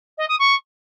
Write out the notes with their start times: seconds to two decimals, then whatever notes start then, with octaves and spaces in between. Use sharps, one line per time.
0.18 D#5
0.29 D#6
0.39 C#6